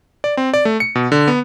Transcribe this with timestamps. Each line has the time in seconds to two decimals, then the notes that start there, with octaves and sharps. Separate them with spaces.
0.24 D5
0.37 C4
0.54 D5
0.65 A3
0.80 C#7
0.95 B2
1.12 D3
1.28 B3